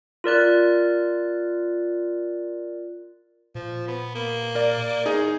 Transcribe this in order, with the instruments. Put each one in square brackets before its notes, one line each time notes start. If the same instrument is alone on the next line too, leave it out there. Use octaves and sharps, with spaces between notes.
[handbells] F4 A#4 D5 F#6
[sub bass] A#2 [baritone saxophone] F3
[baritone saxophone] B3
A#3
[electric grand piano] A#4 D5
[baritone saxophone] E2 [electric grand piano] D#4 G#4 D#5